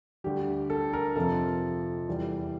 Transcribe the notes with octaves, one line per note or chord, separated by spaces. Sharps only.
D2 D3 G3 G4
A4
A#4
F2 C3 F3 A4
E2 E3 G3